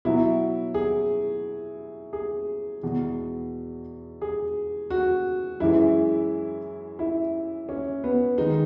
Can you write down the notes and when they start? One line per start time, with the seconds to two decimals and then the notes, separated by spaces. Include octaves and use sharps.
0.05 B2 F#3 E4
0.74 G#4
2.13 G#4
2.83 E2 B2 G#3
4.21 G#4
4.90 F#4
5.60 F#2 E3 G#3 E4
6.99 E4
7.69 C#4
8.04 B3
8.37 D#3 G#3 D#4